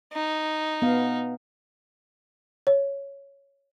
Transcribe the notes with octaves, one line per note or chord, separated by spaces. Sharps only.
D#4
B3 F5
C#5